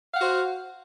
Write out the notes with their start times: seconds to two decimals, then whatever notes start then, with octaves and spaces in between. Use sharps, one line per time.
0.13 F5
0.16 F#5
0.20 F#4
0.23 C5